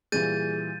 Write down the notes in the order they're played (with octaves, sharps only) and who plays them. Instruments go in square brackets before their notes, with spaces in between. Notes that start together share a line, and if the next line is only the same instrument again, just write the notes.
[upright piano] A#2 E3 G3 [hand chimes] G#4 [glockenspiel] G6 A6 D#7